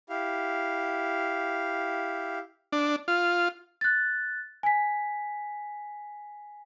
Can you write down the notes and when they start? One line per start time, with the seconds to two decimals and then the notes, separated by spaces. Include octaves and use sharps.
0.09 E4 G4 F5
2.72 D4
3.08 F4
3.81 F#6 A6
4.63 G#5 B6